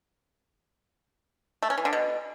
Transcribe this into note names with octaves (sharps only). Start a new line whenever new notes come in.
A3
C#4
E3
D3
B2